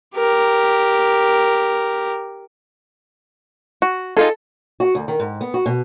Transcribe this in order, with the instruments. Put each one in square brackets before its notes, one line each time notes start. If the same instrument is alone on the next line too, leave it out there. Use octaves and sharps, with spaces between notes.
[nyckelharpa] G4 A#4
[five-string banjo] F#4
[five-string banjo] D#4 F4 G#4 [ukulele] A4
[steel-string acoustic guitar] F#4
D2
D#3
G#2
B3
F#4
B2